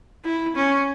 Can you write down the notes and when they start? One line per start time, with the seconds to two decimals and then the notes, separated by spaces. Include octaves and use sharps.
0.24 E4
0.55 C#4